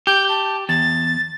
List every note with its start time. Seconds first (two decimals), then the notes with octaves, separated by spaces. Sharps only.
0.07 G4 G6
0.29 A5
0.69 E2 A6